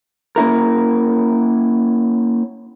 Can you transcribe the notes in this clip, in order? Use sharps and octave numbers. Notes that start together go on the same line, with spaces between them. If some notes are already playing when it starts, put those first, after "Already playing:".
A#3 C#4 E4 A#4